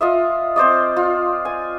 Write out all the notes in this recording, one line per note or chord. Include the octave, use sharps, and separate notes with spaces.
F4 D#5 E5
C4 C5 D5 D#5
F4
G#5